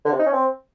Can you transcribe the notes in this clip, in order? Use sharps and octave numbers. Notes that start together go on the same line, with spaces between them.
D3
C3
D#4
C#4
C4